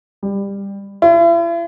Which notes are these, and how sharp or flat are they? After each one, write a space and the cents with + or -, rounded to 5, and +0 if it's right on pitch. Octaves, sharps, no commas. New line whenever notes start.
G3 +20
E4 +40